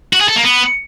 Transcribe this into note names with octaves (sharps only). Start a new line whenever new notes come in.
F#4
G#4
A4
A#3
B3